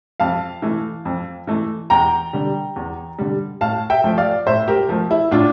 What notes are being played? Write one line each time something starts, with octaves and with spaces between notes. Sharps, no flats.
F2 F5 A5
E3 A3
F2
E3 A3
E2 G5 A#5
D3 G3
E2
D3 G3
A2 F5 A5
E5 G5
F3 A3
D5 F5
A2 C5 E5
G4 A#4
F3 A3
E4
A2 D4 F4